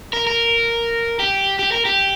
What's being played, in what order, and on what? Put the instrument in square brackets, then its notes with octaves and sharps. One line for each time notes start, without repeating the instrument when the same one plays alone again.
[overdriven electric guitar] A#4
A#4
G4
G4
A#4
G4